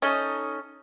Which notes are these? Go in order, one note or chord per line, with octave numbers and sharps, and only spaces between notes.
C#4 D#4 A4 D#5